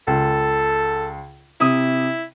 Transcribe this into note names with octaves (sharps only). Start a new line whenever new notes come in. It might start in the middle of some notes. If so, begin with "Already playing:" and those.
C#2 A4
C3 E4 D#6